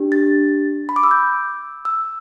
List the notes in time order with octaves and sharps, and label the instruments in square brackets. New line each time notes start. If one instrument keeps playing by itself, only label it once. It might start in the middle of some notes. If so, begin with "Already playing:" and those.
Already playing: [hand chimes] D4 G4
A6
B5
D6
E6
G6
E6